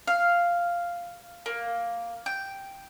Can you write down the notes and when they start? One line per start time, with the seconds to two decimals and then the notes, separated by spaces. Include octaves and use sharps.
0.07 F5
1.46 A#3
2.26 G5